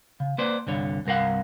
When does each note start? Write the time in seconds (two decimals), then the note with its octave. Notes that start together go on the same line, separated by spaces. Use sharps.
0.20 C#3
0.38 A#3 B4 C5 D5
0.67 C2 G2 D3 C#5
1.05 C2 G2 A#4 F5 F#5